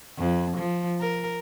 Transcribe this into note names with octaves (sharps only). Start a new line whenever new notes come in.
F2
F3
A#4